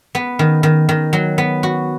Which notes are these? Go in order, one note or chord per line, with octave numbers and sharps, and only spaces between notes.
B3
D#3
D#3
D#3
F#3
B3
F#4